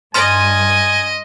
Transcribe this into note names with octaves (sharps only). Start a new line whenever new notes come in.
G2 D#5 G#5 C6 F6 A6